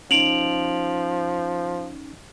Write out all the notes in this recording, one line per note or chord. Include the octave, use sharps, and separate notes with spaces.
F3 C#4 D#4 D7 F7 F#7